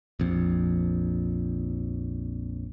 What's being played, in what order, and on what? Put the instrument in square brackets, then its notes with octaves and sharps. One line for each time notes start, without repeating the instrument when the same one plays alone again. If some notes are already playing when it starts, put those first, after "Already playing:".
[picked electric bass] A#1 F2